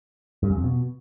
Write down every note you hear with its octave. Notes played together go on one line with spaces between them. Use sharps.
G2
F#2
F2
B2